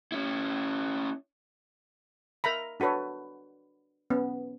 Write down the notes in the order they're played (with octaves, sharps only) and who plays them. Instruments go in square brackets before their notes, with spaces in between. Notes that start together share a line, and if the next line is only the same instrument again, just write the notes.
[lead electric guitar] C#4 E4
[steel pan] A#4 E5 A#5 B5
D4 F#4 A4 B4 C#5
B3 C#4